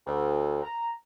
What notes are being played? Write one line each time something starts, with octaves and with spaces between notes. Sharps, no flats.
D2
A#5